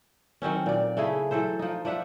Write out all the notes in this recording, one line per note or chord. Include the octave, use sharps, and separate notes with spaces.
D#3 F#3 C4 C#4
A#2 D5
C#3 A3 E4 G#4
E3 F#3 A4 C5
F3 D#4
F3 D5 E5 F#5